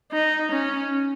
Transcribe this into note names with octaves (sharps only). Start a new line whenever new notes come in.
D#4
C#4